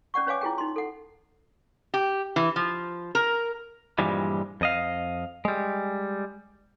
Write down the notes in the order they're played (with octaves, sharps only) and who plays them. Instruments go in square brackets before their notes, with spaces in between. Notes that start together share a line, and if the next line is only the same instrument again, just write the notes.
[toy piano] C#4 D5 F#5 C#6
C#4 B4 C#5 F5 G#5 D6
E4 F4 G#4 G5
D#4 C6
A4 F#5
[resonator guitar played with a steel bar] G4
E3
F3
A#4
[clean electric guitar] G2 A#2 E3 F3 G3 G#3
F2 D#5 F5
G3 G#3